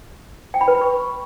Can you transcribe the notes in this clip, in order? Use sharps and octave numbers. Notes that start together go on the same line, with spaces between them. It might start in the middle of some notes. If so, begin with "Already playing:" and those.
G5
B5
B4
B5
C#6